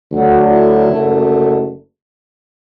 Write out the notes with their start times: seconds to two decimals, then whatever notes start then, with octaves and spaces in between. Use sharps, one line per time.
0.12 D2 D3 F#3 F#4
0.52 E4
0.90 F#1 F#2 D3 F#3 A3